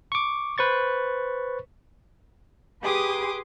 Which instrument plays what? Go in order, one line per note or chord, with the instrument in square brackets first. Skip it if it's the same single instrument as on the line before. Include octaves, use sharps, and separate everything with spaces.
[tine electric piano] C#6 D6
B4 C5 C#6 A6
[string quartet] G4 G#4 B4 C6 D6 D#6